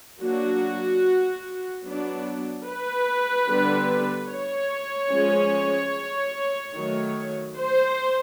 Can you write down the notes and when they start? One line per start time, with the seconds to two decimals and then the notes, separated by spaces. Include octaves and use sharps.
0.21 F#3 A#3 D4 F#4
1.85 F#3 B3 D4
2.66 B4
3.48 D3 G3 B3 D4
4.30 C#5
5.11 F3 G#3 C#4
6.75 D#3 F#3 A3
7.57 C5